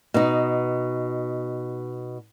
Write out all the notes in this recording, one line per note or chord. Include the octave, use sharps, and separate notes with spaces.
B2 D#4